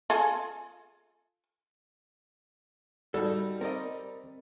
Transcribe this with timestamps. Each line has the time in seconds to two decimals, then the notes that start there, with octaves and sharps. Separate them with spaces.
0.10 F4 G#4 A4
3.14 G3 D#4 F#4 A4
3.61 C4 A#4 D5 D#5